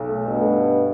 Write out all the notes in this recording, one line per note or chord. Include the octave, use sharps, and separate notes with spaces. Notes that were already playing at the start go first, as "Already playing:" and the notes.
Already playing: B1
A3
G2 B2 A3
A3